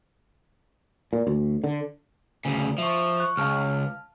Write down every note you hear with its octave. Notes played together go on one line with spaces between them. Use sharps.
A#2
D2
D3
D2 C#3
F3 E5 C#6
C#6 F#6
C#2 F5 A5 F6